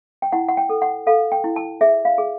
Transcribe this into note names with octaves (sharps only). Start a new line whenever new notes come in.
G5
E4 F#5
F#5
G5
A4
F#5
A4 F5
G5
E4
A5
G#4 E5
F5
G#4